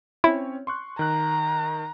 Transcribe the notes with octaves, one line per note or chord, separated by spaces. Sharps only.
C4 C#4 E4 C#5
C6 C#6 F#6
D#3 A#5 F#6